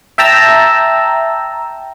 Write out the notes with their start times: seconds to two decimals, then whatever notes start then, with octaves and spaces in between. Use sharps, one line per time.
0.18 E5 G5 A5 A#5 E6